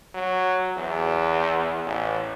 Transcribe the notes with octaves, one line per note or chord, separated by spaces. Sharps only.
F#3
E2
A1